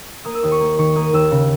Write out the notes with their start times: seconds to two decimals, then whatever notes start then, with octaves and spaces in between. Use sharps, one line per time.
0.25 A#3 D#6
0.35 E6
0.43 D#2 D#6
0.52 C#6
0.60 A#3
0.78 D#3 C#6
0.96 A#3 D#6
1.13 D#2 E6
1.31 C#3